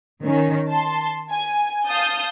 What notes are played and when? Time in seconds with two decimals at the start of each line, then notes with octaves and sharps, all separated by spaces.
0.23 D#3 C#4
0.71 A5 C6
1.31 G#5
1.87 F5 A5 D#6 G6